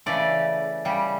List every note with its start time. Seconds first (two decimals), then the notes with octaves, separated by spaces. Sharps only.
0.06 C#3 E3 A3 D5
0.85 C#3 G3